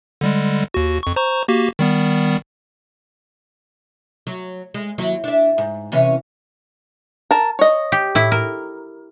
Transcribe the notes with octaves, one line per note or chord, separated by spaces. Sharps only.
D3 G3 G#3
D#2 F#4
F2 C#6
C5 A#5 C#6
A#3 F#4 G4
D#3 G3 B3
F#3
G#3
D#2 F#3 E4
D4 E5
G#2
C3 E3 C#4
A#4 A5
C#5 D#5
G4
A2 E4
A#4